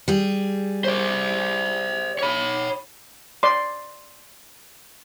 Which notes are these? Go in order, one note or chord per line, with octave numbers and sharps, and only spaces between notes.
G3 G#4
C5 D5
C#5 B5
D5 C6